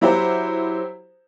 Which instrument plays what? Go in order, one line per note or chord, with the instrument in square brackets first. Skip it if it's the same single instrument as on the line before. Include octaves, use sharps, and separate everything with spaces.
[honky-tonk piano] F#3 E4 G4 C5